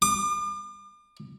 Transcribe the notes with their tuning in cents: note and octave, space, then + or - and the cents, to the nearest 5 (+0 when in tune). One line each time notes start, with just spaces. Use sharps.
D6 +40